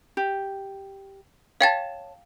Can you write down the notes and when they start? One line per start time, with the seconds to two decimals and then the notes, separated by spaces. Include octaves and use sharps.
0.17 G4
1.61 C#5 F5 G5 A5 A6